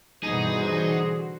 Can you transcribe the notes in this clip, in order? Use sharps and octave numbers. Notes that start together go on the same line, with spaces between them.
G2 B2 D3 E3 D#4 F#4 G#4 C5